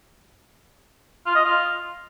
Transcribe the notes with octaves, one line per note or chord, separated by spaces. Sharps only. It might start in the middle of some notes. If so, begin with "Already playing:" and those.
F4
D#5
F4